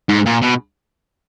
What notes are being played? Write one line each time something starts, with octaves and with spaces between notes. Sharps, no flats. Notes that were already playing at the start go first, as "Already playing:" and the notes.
G#2
A#2
B2